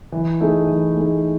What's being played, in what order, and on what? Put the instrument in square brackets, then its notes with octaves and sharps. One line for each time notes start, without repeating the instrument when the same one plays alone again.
[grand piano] E3
A3 D#4 G#4
E3
A3 D#4 G#4